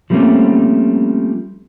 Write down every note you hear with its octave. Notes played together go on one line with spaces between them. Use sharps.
F3 G3 A3 A#3 C4 C#4